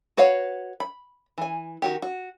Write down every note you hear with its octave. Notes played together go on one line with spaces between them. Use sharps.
F#4 B4 C#5 F5 F#5
B5
E3 G#5
D#3 F#4 G4
F#4